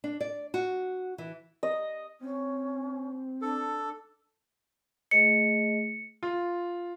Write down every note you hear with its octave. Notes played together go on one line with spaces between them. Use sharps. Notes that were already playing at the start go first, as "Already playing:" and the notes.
D4
D5
F#4
E3
D#5
C4 C#4
D4 A4
A3 G#4 D#5 C#7
F4